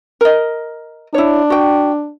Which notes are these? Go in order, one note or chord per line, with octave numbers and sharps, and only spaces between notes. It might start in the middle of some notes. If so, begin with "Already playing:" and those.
A#4 D#5
D4 E4 C#5
F#4 G5